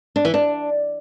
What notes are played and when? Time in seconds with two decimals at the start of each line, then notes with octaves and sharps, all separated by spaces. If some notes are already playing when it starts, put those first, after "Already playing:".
0.16 D4
0.25 E3
0.34 D4